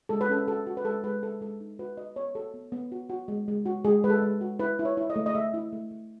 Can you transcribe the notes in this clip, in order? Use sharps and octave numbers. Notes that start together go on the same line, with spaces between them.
G#3 A4
B4
C#4 A4
F#4 A4
F#4
B4
G#3 A4
G#3 B4
G#3 A4
G#3 A4
D#4
F#4 B4
F#4 D#5
B3 C#5
F#4 A4
B3
B3
F#4
F#4
G#3
G#3
F#4
G#3 G#4
G#3 B4
A4
G#3
F#4
E4 B4
E4
C#5
E4
D#5
A3
D#5
A3 E5
E4
A3
A3